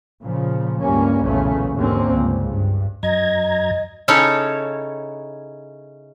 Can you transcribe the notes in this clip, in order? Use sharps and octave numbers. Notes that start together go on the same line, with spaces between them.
A#2 C#3 F3
C#2 G2 G3 A#3 C#4
B1 E2 A#2 C#3 A3 C#4
D#2 G#2 D3 A#3 C4 C#4
C#2 G2
G2
F#2 D#5 A#5 G#6
C#3 C#4 D#4 E4 A4 C#5